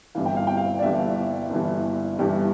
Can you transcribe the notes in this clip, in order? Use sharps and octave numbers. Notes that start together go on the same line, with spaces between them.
G1 G2 E3 F5
G5
F5
G5
F5
D5
G1 G2 E3 E5
G1 G2 E3
G1 G2 E3 G4